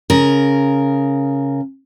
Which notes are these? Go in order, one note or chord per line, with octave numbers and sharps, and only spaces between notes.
C#3 A#4